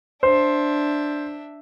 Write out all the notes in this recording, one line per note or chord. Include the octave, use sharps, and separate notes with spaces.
D4 C5 E5